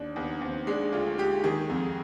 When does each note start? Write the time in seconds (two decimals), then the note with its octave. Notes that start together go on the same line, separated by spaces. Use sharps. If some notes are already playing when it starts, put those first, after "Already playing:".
Already playing: D#2 D4
0.16 D#2 B3
0.41 D#2 C4
0.67 G#3 D4
0.93 D2 F4
1.18 G#3 G4
1.44 D#3 G#4
1.70 F2